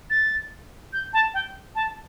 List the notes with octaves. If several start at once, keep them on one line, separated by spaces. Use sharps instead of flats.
A6
G6
A5
G5
A5